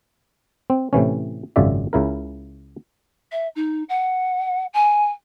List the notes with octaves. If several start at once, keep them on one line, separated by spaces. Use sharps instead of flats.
C4
A2 C3 E3 C#4
G#1 F#2 C#3 F4 D5 E5
C#2 C#3 E4 A#4
E5
D#4
F#5
G#5